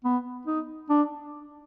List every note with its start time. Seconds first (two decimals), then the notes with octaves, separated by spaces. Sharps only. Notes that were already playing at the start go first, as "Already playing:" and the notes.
0.04 B3
0.47 D#4
0.89 D4